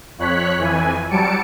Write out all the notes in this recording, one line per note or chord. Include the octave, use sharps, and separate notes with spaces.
F2 C#5 F#6 B6
F2 E3 G#5
F#3 G3 A5 C#7 D7